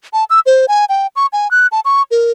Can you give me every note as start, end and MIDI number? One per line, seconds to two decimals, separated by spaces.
0.13 0.24 81
0.30 0.40 88
0.46 0.66 72
0.68 0.85 80
0.89 1.07 79
1.16 1.26 85
1.33 1.50 80
1.51 1.67 90
1.72 1.80 81
1.85 2.03 85
2.11 2.32 70